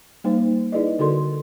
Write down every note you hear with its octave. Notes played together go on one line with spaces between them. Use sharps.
G3 A#3 D#4 C5
D#4 E4 G#4 B4 D5 D#5
D3 F#4 A4 A#4 D5 C6